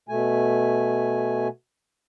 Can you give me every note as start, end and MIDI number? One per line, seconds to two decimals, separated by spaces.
0.09 1.48 47
0.09 1.48 57
0.09 1.48 80